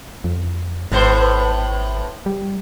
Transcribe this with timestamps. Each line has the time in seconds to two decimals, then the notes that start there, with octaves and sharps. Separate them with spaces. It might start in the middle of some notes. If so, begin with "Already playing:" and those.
0.24 F2
0.92 G#1 A2 B3 C5
2.26 G3